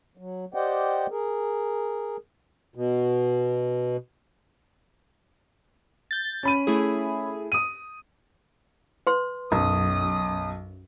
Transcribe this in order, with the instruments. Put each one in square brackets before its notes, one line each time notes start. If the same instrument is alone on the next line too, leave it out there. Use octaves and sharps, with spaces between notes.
[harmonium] F#3
G4 C5 D5 D#5 F#5 G5
G#4 A#4
B2
[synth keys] G6 A6
[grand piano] C#4 B5 D#7
[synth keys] A3 E4 G#4
[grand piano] D#6 D#7
[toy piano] B4 C6
[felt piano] B1 [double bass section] F#2 [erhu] D#6